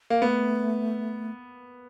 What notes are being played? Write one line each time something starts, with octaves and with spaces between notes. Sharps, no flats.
A#3
A3 B3